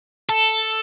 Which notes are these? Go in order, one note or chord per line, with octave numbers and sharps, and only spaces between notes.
A4